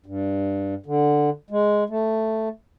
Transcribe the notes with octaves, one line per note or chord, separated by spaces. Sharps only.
G2
D3
G#3
A3